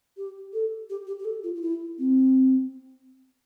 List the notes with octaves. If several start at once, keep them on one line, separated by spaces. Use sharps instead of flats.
G4
A4
G4
G4
G4
A4
F4
F4
E4
C4